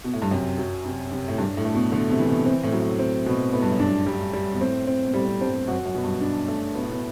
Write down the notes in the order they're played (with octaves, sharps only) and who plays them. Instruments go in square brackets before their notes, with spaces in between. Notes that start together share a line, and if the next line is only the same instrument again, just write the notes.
[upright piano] B2
A2
G2
[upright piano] F#2 [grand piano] C3
[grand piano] F#3
C3
C3
[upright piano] A2
[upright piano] G2 [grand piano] D4
[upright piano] A2
[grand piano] A3
[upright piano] B2
[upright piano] D3 [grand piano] A3
[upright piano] C3
[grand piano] E3
[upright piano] B2
[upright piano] C3 [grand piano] C4
[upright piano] A2
[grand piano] F#3
[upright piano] A2
[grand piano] C4
B2
[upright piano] A2 [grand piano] B3
[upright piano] G2
F#2
[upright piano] G2 [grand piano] D4
[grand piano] G3
G3
[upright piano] B2
[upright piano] A2 [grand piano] C4
[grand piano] C4
[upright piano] B2
[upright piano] A2 [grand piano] G3
[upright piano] G2 [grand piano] C4
[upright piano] F#2 [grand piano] F#4
[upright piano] F#2
[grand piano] B2
[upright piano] G2
[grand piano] D4
A3
[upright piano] B2 [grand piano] B3
[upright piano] A2
B2